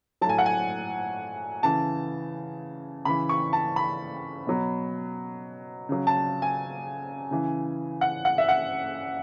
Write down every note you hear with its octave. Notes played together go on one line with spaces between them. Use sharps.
A2 F#3 G#5 A5
F#5
G#5
C#3 E3 A5
C#3 E3 B5
C#6
A5
B5
B2 F#3
C#3 F#3
A5
G#5
C#3 E3
F#5
F#5
E5
F#5